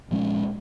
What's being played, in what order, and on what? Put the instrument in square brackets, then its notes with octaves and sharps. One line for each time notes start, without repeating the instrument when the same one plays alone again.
[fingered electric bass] A#2 F3 G#3 C#4